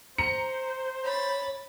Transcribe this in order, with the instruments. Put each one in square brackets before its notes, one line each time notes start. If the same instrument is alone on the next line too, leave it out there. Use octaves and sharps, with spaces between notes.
[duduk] C5 [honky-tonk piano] A#5 C#7
[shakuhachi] C#5 [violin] B5 A6